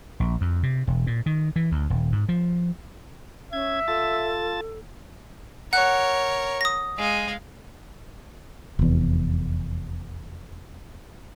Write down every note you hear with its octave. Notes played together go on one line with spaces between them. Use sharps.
A#1
F2
C3
E1
A#2
D#3
E3
D2
D#1
G#2
F3
C#4 E5 G#6
F4 A4 A5 A6
A#4 C#5 F#5 F#6
D#6 A#6
G#3 F5
F1 E2